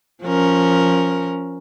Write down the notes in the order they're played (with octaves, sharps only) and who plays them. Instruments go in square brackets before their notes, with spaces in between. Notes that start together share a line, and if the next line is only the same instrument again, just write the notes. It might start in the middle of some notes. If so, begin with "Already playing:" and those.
[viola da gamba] F3 C#4 A#4